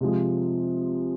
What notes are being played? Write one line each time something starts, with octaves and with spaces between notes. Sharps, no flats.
C3 F3 G#3